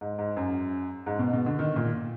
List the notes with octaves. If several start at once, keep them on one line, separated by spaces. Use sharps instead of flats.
G#2
G#2
F#2
G#2
B2
B2
D3
D#3
A#2